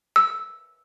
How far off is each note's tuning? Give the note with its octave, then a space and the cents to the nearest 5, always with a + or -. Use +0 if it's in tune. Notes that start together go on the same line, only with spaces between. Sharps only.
E6 -5